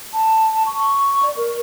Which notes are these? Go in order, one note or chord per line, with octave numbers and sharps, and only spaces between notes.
A5
C#6
D5
A#4